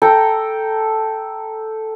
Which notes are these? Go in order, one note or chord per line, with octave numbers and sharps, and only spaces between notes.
A4 G5 A#5